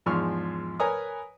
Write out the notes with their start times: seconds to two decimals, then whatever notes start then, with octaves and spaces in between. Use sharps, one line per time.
0.06 E2 G#2 F3 C#6 F6
0.80 A#4 B4 C#5 G#5 A#5 D#6